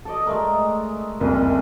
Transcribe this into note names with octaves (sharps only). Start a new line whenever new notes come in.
A4 D5 D#5
G#3 A3 A#4
F#1 C2 F2